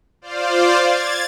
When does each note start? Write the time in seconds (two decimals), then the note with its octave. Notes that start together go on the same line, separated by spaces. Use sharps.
0.21 F4 C5 D5 F5
0.78 G#6 A6